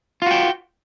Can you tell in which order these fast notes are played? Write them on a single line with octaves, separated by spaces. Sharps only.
F4 F#4 G5